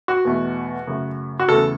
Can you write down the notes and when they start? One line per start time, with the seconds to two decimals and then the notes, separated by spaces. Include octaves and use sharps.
0.08 F#4
0.25 E2 B2 A3
0.87 F#2 C#3 A3
1.40 F#4
1.49 E2 C#3 A3 A4